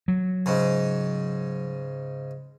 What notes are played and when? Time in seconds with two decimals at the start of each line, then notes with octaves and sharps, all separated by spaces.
0.08 F#3
0.46 G#2 C#3